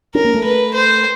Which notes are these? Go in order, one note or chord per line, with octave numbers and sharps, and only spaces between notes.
C#4 A#4
A#3
A3
B4
C5